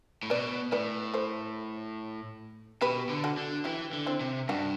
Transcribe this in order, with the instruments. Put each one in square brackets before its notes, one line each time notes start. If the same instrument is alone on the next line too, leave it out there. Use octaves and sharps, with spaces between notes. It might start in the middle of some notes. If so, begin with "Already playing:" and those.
[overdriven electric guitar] A2
[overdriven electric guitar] B2 [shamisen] B4 D5
[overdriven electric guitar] A2 [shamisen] B4 D5
[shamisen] A4 C5
[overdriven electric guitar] B2 [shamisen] G4 B4
[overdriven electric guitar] D3
[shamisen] F#4 A4
[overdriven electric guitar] D3
[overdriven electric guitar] E3 [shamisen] E4 G4
[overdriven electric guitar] D3
[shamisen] C4 E4
[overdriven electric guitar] C3
[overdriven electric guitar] G2 [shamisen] D4 F#4